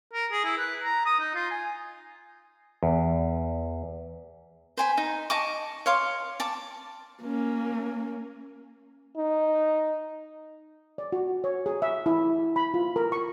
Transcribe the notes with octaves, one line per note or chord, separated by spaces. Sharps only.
A#4
G#4
E4
B4
A#5
D#6
D#4
F4
G#5
E2
C5 G#5 B5
D#4
D#5 A5 C#6 D6
C#5 F5 C6 D6
A5 D6
A#3 C#4
D#4
D5
F#4
C#5
G#4
E5
E4
B5
F4
A#4
C#6